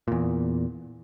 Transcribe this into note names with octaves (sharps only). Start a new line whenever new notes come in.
E2 A#2